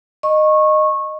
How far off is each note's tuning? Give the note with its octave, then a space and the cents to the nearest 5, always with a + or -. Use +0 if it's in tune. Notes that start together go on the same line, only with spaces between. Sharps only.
D#5 -15 C#6 -20